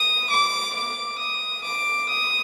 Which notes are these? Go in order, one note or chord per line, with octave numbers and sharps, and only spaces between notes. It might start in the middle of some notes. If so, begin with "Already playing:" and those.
Already playing: D#6
D6
D6
D#6
D6
D#6